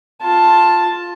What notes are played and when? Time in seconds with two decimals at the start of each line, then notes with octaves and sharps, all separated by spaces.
0.22 F4 A5